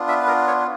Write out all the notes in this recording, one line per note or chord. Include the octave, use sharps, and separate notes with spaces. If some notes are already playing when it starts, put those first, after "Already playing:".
Already playing: B3 D4 F4
E5
B4
A#4
C#5